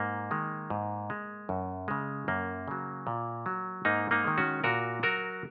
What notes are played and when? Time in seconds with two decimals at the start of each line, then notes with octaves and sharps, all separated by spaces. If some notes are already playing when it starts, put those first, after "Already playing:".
Already playing: G#2 A#3
0.31 D#3 G#3
0.70 G#2
1.10 G#3
1.49 F#2
1.88 C#3 G#3
2.28 F#2 A#3
2.68 C#3 F#3
3.07 A#2
3.46 F#3
3.85 G#2 A#3 D#4
4.11 A#3 D#4
4.24 D#3 G#3
4.38 C#4 F#4
4.64 A#2 F#4 A#4
5.03 F#3 F#4 A#4